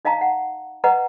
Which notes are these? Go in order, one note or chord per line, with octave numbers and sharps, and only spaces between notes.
D#4 D#5 F5 A5 A#5
F#5
B4 D#5 F#5 A#5